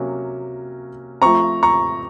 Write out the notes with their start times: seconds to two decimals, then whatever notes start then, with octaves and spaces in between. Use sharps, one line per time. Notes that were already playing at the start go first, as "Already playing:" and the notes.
Already playing: C3 F#3 A#3 C#4
1.22 F3 A3 C4 A#5 C#6
1.63 A#5 C#6